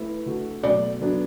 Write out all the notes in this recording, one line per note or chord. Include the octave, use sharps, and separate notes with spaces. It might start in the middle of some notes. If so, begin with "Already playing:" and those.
Already playing: A3 E4 B4
D3 A3 F#4 A4
B2 F#3 A3 D5
D3 F#3 B3 D4